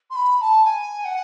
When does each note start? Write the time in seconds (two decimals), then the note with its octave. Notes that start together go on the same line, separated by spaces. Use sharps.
0.10 C6
0.15 B5
0.37 B5
0.41 A5
0.64 G#5
1.04 F#5